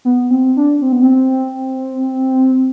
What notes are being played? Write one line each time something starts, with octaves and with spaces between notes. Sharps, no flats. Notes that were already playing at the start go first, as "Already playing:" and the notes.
B3
C4
D4
C4
B3
C4